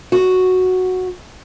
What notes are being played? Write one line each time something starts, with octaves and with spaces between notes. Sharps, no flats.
F#4